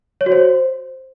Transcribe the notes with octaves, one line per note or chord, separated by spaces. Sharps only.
C#5
F#4
C5